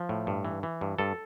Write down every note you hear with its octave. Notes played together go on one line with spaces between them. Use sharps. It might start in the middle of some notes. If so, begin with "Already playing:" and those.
Already playing: F3
A2
G2
E3
E3
G2
G2 A4